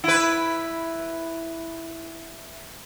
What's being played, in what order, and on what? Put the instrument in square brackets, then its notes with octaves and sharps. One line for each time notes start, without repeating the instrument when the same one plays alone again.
[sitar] E4 B4